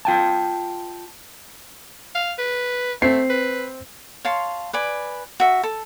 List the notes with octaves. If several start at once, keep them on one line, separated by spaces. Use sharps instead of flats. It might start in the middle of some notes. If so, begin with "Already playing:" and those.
F4 G5 A5
F5
B4
A3 C4 C7
B4
C#5 F5 A5 C6
B4 D5 G#5
F#4 E5
A4